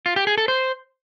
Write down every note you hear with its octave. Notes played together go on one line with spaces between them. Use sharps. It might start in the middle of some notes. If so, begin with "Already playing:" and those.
F4
G4
G#4
A4
C5